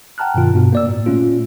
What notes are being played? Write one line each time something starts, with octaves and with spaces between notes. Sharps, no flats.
F#5 G5 A5 A#5 F6 F#6
G2 B2 D#3 F4
G2 B2
A#3 D5 E6
A2
A#2 A3 C#4 F4